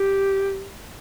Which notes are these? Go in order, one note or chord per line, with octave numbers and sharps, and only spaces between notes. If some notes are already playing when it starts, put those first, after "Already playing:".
Already playing: G4